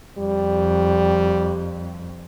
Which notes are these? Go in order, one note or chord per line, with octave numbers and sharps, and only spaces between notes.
F2 G3